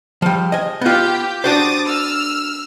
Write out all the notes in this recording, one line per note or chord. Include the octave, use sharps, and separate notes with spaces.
F3 G3
D#5 G#5
B3 F4 G4 G6
D4 F#4 C5 D6 D#6 A6
E6 F6